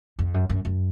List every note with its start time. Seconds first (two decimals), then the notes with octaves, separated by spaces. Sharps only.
0.19 F2
0.34 F#2
0.49 F#2
0.65 F#2